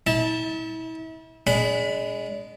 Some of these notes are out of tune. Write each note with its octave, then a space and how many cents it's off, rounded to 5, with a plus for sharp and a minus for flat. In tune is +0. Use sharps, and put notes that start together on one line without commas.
E4 -40 A5 +0
G#3 +0 D4 -30 B5 +15